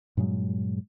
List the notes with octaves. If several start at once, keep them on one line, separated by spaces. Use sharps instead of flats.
G2 A#2 F#3 G#3